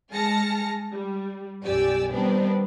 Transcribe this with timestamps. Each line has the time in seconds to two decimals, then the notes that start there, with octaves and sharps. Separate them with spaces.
0.12 G#3 G#4 A5 F6 A#6 C#7
0.92 G3
1.64 B1 F#2 G4 D5 G#5 E6
2.12 D#3 G3 B3 C4 D4 B4